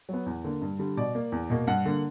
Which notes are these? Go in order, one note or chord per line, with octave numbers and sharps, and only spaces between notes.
F#3 B3
E2
D3 A#3
G2
D3 G3
B2 D5
A#3
E2
B2 A#3
G2 F#5
D3 A#3